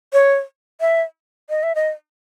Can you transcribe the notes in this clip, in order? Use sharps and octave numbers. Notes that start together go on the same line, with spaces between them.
C#5
E5
D#5
E5
D#5